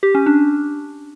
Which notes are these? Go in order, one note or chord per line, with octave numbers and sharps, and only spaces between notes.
G4
C#4
D4